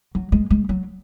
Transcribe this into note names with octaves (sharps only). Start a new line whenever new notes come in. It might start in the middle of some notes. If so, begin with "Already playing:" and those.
F#3
G#3
G#3
F#3